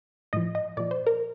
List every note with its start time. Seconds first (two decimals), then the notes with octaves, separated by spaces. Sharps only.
0.33 A2 F3 D#5
0.55 D#5
0.77 A#2 F3 D5
0.91 C5
1.07 A#4